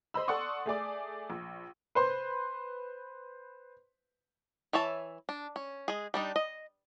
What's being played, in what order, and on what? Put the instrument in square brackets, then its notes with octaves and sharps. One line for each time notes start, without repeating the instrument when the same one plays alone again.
[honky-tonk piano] C5 D#5 B5 E6
A4 D5 F#5 C6 C#6 D#6
A3 G#4 D5 D6
A#1
[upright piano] B4 C5 C6
[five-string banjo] E3 C#5 E5 A5
D4
C#4
G#3 G#4
G3 D4 D#4
D#5